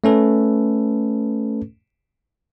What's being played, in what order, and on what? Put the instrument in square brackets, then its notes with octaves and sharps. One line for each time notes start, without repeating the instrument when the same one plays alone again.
[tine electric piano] A3 C#4 A4 B4